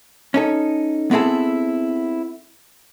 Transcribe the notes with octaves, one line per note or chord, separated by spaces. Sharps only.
C#4 D#4 A4
B3 C4 E4 G#4 A4